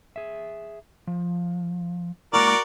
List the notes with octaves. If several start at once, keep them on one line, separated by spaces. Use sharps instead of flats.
G#4 E5
F3
G#3 A#3 E4 F#4 A#4 D5